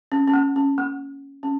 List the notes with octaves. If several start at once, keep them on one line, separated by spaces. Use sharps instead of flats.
C#4
C#4
A#3
C#4
A#3
C#4